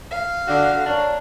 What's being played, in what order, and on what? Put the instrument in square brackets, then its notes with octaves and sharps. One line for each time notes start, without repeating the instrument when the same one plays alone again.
[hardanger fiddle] F5
[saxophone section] D3 [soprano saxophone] F#4
[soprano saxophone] D4 [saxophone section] A#4 C#5